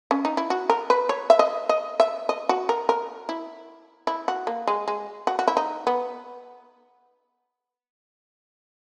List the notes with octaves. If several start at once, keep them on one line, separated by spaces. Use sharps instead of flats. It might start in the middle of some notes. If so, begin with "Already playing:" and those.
C#4
D#4
E4
F#4
A#4
B4
C#5
E5
D#5
D#5
E5
D#5
F#4
A#4
A#4
E4
E4
F#4
A#3
G#3
G#3
F#4
F#4
E4
D#4
B3